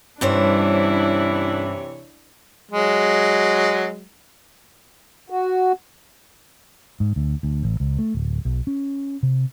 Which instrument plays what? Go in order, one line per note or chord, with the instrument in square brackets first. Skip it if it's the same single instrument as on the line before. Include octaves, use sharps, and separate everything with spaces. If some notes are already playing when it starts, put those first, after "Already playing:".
[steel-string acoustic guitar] G2 C#4 C5 [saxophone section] C3 E3 C#5 [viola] D4 E4
[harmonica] F#3 G#3
[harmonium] F#4
[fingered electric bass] G#2
D2
D2
A1
C#2
A3
D1
B1
C#4
C3